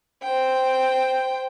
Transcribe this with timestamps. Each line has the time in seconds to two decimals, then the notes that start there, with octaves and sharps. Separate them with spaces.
0.23 C5 G5